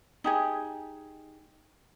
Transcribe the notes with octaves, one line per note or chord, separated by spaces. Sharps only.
D#4 G4 G#4